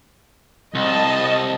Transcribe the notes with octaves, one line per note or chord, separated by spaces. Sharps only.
C2 D#5 A5